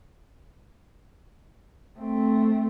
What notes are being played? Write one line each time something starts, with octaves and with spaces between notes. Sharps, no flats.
A3 C4